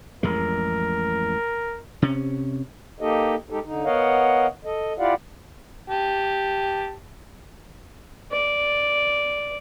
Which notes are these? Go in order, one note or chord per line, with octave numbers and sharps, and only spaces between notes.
A1 F2 G#3 A#4
C3 C#4
A#3 D#4 G4 A4 D#5
G#3 D#4 G4 A4
D3 D#4
B3 A#4 C#5 D#5 F5 F#5
A4 D#5
E4 F4 G4 D5 F5 F#5
G4 A5
D5